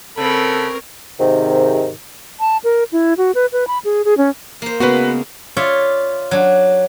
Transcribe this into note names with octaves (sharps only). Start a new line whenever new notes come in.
C#3 C4 A4 A#4 B5
G#2 C3 D#3
A5
A#4
E4
F#4
B4
B4
B5
G#4
G#4
C#4
A#3 C5
C#3 G#3 A#3 B3 F#4 B4
F4 C#5 D5 E5
F#3 D4